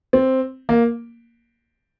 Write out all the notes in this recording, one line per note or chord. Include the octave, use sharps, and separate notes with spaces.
C4
A#3